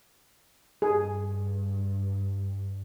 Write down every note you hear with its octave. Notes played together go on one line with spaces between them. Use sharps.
G2 G#4